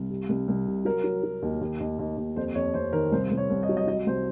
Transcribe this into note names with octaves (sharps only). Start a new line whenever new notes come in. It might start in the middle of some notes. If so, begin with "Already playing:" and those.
Already playing: C2
C3
C2
C2
C3
F#3 A#4
F#3
F#3
D#2
D#2
D#2
D#2
D#2
F2 C5
F2 C#5
F2 C5
D#3 A#4
C2 C5
C2
C#5
C2
D#5
F#3 C#5
D#5
F#3 D#5
C2 C5